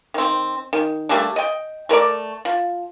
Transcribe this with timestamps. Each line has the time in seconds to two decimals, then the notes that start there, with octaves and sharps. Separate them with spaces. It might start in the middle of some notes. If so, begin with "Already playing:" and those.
0.14 D#3 C4
0.73 D#3
1.09 G3 A3 A#3 D4
1.36 D#5 G5
1.89 A3 A#4 B4 D5
2.45 F3